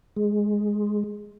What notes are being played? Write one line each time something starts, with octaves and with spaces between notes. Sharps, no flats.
G#3